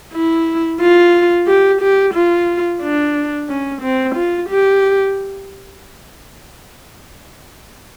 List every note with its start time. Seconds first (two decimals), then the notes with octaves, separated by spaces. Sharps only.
0.14 E4
0.80 F4
1.47 G4
1.81 G4
2.14 F4
2.82 D4
3.49 C#4
3.82 C4
4.15 F4
4.49 G4